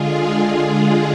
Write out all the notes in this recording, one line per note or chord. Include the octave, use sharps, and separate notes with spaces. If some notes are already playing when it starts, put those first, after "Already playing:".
Already playing: D3 G#3 F4 G#4
F4 G#4